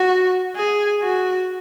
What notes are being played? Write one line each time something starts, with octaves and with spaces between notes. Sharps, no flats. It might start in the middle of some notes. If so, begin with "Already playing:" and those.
Already playing: F#4
G#4
F#4